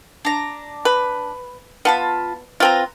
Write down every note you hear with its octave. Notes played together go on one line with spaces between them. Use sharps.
D4 A#5
B4
B3 F4 A5 B5
C4 F4 B4 A#5